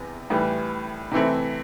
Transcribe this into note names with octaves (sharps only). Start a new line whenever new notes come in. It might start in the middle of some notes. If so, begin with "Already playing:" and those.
Already playing: E2 C3
A2 E3 G3
C3 E3 A3 C4 E4